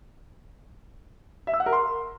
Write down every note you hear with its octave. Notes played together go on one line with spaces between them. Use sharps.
E5
E6
F#5
A#4
C6